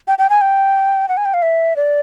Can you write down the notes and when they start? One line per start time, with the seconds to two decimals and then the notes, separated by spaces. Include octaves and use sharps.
0.08 G5
0.19 G5
0.30 G#5
0.41 G5
1.09 F#5
1.17 G#5
1.25 G5
1.34 F5
1.42 E5
1.76 D5